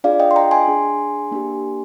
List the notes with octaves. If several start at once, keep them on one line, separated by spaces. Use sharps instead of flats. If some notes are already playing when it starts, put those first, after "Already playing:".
D4 F4 G#4 D5 F5
D#5 G5
C6
G5 A#5
G#5 C6
D4 G#4
A#3 D4 G4